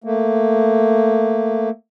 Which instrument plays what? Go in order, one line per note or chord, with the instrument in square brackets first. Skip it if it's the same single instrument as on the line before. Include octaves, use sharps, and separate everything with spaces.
[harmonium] A3 A#3